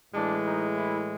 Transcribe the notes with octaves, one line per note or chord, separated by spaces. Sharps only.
A2 E3 G#3 D4
D#4
E4